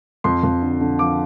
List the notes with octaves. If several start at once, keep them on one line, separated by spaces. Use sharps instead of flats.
F2 C6
F2
D3
D3
F3 D6